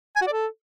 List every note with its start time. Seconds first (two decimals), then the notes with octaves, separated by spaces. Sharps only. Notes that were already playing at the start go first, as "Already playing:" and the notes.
0.16 G#5
0.21 F#4
0.27 D5
0.32 A4